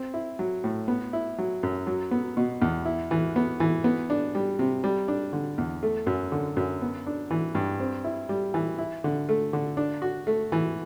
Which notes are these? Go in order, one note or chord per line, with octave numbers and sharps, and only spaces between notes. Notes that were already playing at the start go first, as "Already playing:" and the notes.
Already playing: C4
E4
F#3
A2
B3
E4
F#3
F#2
F#3
B3
B2
E2
E4
E3
B3
E3
B3
D4
G3
C3
G3
D4
D3
E2
A3
F#2
D3
F#2
B3
D4
E3
G2
C4
E4
G3
E3
E4
D3
A3
D3
D4
F#4
A3
E3